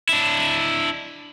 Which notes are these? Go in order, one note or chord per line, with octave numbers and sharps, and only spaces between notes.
D4 E4